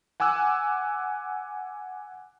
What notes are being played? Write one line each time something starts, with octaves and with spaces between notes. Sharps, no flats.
F#5 G#5 D6 E6 F#6